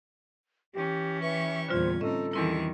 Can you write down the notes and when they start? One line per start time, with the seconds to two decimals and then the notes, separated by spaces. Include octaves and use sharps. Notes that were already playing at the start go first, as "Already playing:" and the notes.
0.74 E3 C#4 G4
1.22 G4 B4 E5 C#6
1.69 E2 A#2 D3 G3 F4 C5 G#6
2.01 A2 C4 C#4 D#4 A4 D#5
2.33 E2 D#3 E3 G3 C4 E4 C#6